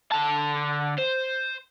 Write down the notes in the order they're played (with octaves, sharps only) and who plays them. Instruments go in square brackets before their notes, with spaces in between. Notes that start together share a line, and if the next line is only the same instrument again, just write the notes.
[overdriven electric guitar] D3 A5
C5